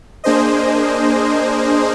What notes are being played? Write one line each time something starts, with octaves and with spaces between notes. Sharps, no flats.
A#3 D4 G#4 C5 D#5